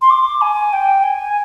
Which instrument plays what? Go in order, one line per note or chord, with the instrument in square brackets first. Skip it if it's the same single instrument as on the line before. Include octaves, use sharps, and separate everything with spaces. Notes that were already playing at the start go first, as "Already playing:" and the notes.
[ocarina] C6
D6
G#5
G5
G#5